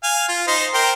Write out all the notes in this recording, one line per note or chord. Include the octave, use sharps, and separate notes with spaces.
F5 G#5
F4
D#4 C5
A#4 C5 G5